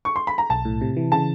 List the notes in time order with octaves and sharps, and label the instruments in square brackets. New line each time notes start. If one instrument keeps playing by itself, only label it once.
[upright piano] C#6
C6
B5
A#5
[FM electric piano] B1 [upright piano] A5
[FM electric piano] A2
C3
E3
[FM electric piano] C#3 [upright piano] A5